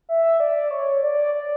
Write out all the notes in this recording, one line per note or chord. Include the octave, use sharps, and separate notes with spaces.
E5
D5
C#5
D5
D5